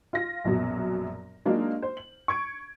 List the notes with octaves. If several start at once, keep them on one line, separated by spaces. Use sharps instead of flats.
F4 A#6
A#1 F#2 B2 F#3
F#3 G#3 A#3 D4 D#4 F4
C5
F#7
C#6 G#6 D7